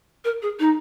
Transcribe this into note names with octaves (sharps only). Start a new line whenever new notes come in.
A#4
G#4
D#4